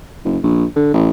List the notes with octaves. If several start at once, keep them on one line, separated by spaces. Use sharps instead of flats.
F#1
A#1
D3
A1